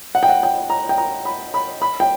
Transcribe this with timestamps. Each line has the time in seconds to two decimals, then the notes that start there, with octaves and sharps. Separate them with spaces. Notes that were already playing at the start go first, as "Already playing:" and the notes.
0.15 F#5
0.23 G5
0.29 F#5
0.43 G5
0.70 A#5
0.89 G5
0.98 A#5
1.25 B5
1.54 B5
1.82 B5
2.00 G5